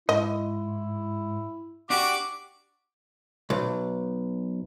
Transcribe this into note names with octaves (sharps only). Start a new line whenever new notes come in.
G#2 E4 D#5
D4 F#4 G4 D6
B1